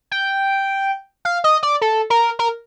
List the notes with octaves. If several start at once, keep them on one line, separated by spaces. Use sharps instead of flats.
G5
F5
D#5
D5
A4
A#4
A#4